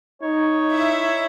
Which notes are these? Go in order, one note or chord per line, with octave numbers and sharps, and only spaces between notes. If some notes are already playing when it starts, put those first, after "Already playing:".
D#4 C#5
E4 E5